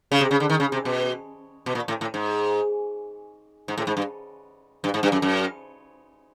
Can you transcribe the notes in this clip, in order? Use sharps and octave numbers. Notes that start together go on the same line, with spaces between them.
C#3
C3
C#3
D3
D#3
C#3
C3
B2
B2
A#2
A2
A2
G#2
G#2
A2
G#2
G2
G2
G#2
G2
F#2
F#2